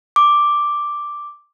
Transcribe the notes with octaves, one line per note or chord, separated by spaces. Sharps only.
D6